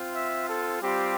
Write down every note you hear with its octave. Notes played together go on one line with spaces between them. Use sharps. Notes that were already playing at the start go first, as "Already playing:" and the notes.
Already playing: C4 F4
E5
A4
G3 C4 F4 G4